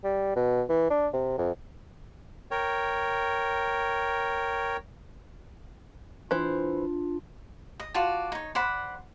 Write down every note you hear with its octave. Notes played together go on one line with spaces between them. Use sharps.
G3
B2
E3
D4
C3
F2
A#4 C#5 G5
E3 D4 F4 C5
D#5
F4 F#4 D5 A5
D#4 C#5
C5 D5 F#5 B5